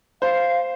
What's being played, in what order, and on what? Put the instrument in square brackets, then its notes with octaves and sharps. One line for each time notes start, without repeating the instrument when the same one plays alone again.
[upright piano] C5 [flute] F5